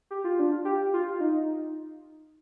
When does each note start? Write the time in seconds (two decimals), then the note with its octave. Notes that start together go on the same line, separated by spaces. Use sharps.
0.11 G4
0.24 F4
0.39 D4
0.51 F4
0.65 G4
0.93 F4
1.20 D#4